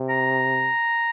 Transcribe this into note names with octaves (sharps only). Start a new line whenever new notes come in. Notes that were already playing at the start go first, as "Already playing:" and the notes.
Already playing: C3
A#5